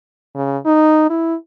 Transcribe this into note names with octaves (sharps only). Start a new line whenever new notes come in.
C#3
D#4
E4